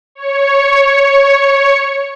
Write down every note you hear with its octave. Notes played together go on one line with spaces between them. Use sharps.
C#5 C#7